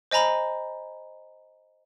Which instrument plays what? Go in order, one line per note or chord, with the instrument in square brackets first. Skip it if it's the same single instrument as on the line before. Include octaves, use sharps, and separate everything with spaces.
[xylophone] C5 D#5 G#5 A#5 B5